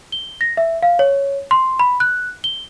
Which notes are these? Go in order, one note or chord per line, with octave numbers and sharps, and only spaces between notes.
G7
A#6
E5
F5
C#5
C6
B5
F#6
G7